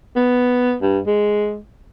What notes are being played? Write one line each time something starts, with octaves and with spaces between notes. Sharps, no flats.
B3
G2
G#3